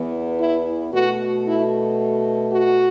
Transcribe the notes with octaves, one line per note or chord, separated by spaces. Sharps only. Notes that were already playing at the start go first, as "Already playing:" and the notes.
Already playing: E2 E3 B3
E4
B2 A3 F#4
E4
F#4